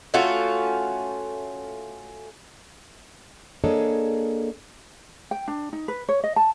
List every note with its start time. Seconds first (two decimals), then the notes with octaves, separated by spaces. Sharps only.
0.14 A3 C#4 F4 F#4
3.64 A#3 D4 G#4 A4 C#5 D#5
5.31 G5
5.48 D4
5.73 D#4
5.88 B4
6.09 C#5
6.24 D#5
6.36 A5